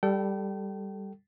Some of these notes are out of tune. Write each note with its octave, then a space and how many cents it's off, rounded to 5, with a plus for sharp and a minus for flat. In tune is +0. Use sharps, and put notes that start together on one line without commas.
G3 +5 A4 +0 G5 -30